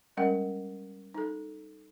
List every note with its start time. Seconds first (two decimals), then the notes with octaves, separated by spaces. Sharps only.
0.17 G3 G#3 C#4 A#4 F#5 G5
1.14 D#4 A4